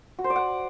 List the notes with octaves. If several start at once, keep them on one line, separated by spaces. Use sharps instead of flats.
F#4
C5
D5
F#5